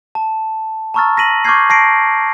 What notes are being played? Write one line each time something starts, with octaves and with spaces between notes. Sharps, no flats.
A5
A5 A#5 C#6 E6 F6 A6
A#6 B6 D#7 F#7
C#6 D6 F6 G6 G#6 C7
A5 A#6 C7 D7